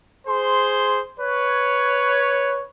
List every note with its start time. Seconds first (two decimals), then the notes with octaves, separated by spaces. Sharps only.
0.27 G#4 C5 C6
1.20 B4 C#5